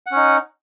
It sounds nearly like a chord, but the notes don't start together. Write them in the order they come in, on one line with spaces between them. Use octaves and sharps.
F#5 C#4 D#4